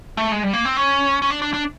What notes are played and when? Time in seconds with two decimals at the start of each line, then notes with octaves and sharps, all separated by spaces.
0.17 A3
0.32 G#3
0.43 G3
0.54 A#3
0.65 C4
0.77 C#4
1.22 C#4
1.30 D4
1.42 D4
1.54 D4